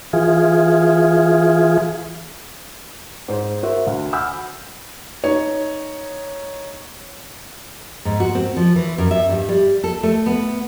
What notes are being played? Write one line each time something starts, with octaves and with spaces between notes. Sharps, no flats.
E3 F4 G#4
G#2 C5
F#4 A#4 C5 E5
D2
F#5 G#5 B5 E6 F6 G6
D#4 C#5
G#2
F#4
C4
F3
E3
F#2
E5
G2
G3
A4
A3
B3